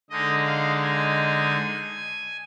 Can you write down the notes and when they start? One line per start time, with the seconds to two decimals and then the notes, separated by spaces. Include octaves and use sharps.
0.10 D3 G#3 D#4 D#5
0.46 F5
0.83 G#5